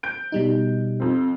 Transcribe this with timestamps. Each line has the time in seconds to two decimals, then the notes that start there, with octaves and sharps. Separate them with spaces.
0.03 G6 D7
0.32 B2 G3 D#4
1.00 F2 C4